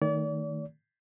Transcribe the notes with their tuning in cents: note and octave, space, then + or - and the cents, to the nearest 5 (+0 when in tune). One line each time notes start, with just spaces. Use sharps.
D#3 +0 A3 +30 D5 -40